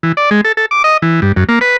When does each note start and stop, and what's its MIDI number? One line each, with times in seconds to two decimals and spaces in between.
0.03 0.12 52
0.17 0.30 74
0.31 0.41 56
0.45 0.52 69
0.57 0.66 69
0.71 0.83 86
0.84 0.97 75
1.02 1.20 52
1.22 1.32 43
1.36 1.44 42
1.49 1.59 58
1.61 1.77 71